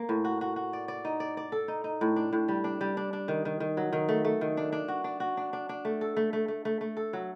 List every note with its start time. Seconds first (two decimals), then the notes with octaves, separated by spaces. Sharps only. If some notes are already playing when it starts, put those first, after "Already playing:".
Already playing: A#3
0.09 A2
0.25 F#4
0.41 F#4
0.56 F#4
0.73 D5
0.88 D5
1.05 D#4
1.20 D5
1.37 D5
1.52 A4
1.68 D#4
1.84 D#4
2.01 A2
2.16 D4
2.33 A2
2.48 G3
2.64 D4
2.81 G3
2.97 D4
3.13 D4
3.28 D#3
3.45 D#3
3.60 D#3
3.77 F#3
3.93 D#3
4.09 A3
4.25 A3
4.41 D#3
4.57 D4
4.72 D4
4.88 F#4
5.04 D4
5.20 F#4
5.37 D4
5.53 D4
5.69 D4
5.85 A3
6.01 A4
6.17 A3
6.33 A3
6.48 A3
6.65 A3
6.81 A3
6.97 A4
7.13 F#3